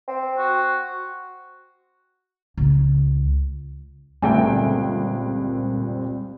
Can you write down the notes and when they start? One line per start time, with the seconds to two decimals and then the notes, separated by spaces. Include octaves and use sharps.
0.08 C4
0.38 F#4
2.57 C#2
4.22 G1 C#2 A#2 G3 A3 C4 G5 G#5